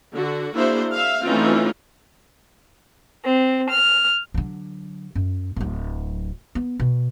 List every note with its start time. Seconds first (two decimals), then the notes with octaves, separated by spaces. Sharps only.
0.14 D3 F#4
0.54 A#3 D4 E4 F#4 G#4 C5
0.92 E5 F5
1.24 E3 A3 C4 C#4 D#4 F4
3.23 C4
3.70 F6
4.34 D3 F#3
5.15 F#2
5.56 D1 F#3
6.55 B3
6.80 B2